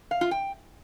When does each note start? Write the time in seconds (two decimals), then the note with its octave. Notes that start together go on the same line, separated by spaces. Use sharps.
0.11 F5
0.21 F4
0.31 G5